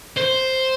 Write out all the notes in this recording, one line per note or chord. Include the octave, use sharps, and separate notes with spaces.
C5